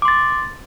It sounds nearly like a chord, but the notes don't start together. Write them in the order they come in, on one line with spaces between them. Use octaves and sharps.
D6 C6 A6